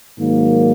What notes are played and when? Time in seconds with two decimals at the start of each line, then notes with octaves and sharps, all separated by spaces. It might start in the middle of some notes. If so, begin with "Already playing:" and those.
0.17 G#2 D#3 F#3 A#3